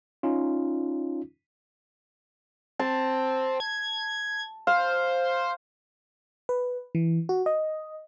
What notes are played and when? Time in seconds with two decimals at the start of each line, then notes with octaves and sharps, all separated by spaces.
0.23 C#4 D#4 F4
2.79 C4 A5
3.60 G#6
4.67 C5 F5
6.49 B4
6.95 E3
7.29 F#4
7.46 D#5